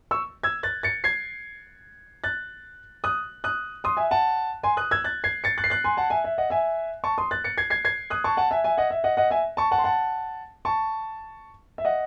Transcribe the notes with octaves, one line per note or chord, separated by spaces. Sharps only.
C#6 E6
E6 G#6
F#6 A6
A6 C#7
G#6 C7
F#6 A6
D#6 F#6
D#6 F#6
C6 D#6
E5 G#5
F#5 A5
G#5 C6
D#6 F#6
E6 G#6
F#6 A6
G#6 C7
A6 C#7
F#6 A6
C7
F#6 A6
G#5 C6
F#5 A5
E5 G#5
E5
D#5 F#5
E5 G#5
A5 C#6
C6 D#6
F#6 A6
A6 C#7
G#6 C7
G#6 C7
G#6 C7
D#6 F#6
A5 C#6
F#5 A5
E5 G#5
E5 G#5
D#5 F#5
E5
D#5 F#5
D#5 F#5
E5 G#5
A5 C#6
F#5 A5
C6
F#5 A5
A5 C#6
E5
D#5 F#5